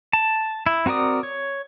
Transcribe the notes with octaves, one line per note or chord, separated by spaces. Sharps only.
A5
E4
C4 F#4 A#4 D5 D#6
C#5